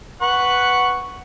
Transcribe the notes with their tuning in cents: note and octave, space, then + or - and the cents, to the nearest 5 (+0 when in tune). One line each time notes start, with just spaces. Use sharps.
B4 +0 F#5 +0 C#6 +0